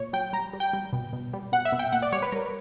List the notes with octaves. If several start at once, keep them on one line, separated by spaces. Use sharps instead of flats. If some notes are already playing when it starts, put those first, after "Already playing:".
Already playing: A#2 C#5
F#3 G5
G3 A#5
G3
G5
G3
B2
B2
G3
B2 F#5
E5
B2
G5
A#2 F#5
D5
G3 C#5
B4
G3 A#4